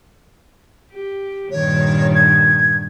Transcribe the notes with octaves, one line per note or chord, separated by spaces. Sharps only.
G4
G2 A#2 D#3 C#5
G#6